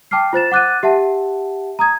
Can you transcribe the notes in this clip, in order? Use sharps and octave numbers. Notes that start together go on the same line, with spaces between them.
G5 A5 D6 F6 C7
F4 C5 A6 E7
F#5 D6 F#6 A6 D#7
G4 E5 F#5 A5
A#5 D#6 G#6